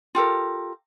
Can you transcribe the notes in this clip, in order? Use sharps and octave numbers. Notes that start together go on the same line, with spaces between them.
F4 G4 A4 A#4